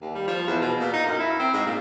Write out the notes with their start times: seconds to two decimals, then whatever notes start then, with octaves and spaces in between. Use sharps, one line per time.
0.02 D#2
0.15 G3
0.27 F3
0.47 E2
0.61 B2
0.80 A#2
0.94 D#4
1.06 F#2
1.19 E4
1.40 C4
1.54 G#2
1.67 A#2